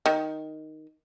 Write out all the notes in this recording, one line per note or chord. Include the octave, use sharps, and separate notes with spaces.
D#3